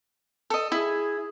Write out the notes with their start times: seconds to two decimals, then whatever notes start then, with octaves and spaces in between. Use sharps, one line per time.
0.50 A4 D#5
0.72 E4 G#4